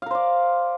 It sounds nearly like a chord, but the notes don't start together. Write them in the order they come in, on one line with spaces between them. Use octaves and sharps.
F5 A#4 C5 D5